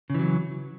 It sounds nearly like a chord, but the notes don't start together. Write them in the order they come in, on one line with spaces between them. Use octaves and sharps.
C#3 E3 F#3